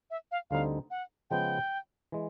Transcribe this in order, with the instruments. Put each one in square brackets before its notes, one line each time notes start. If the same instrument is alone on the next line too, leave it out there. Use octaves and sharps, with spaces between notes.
[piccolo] E5
F5
[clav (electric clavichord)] D2 D3 G3 C4 D#4 [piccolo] F5
[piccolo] F#5
[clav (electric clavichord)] C#3 F3 G#3 B3 [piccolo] G5
[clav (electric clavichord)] E3 G#3